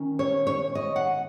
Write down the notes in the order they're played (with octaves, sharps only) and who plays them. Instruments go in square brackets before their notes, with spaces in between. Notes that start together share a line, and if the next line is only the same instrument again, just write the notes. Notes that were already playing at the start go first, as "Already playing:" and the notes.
Already playing: [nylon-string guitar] D#3 C#4
C#5
C#5
D#5
F#5